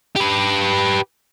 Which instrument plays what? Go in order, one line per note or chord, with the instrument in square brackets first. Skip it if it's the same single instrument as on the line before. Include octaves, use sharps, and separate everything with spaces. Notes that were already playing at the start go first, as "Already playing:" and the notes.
[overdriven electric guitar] G4 B4